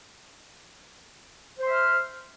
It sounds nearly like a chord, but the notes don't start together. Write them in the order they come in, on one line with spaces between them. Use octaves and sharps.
C5 C6 E5 F6